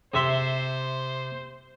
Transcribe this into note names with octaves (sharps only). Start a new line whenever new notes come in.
C3 C5 E5 C6